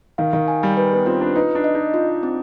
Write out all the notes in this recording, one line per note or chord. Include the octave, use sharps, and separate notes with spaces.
D#3 F5
D#3
G#5
G3
B4
B3
C4 F4
D4
D#4 B4
D4
D#5
D#4
F4
C4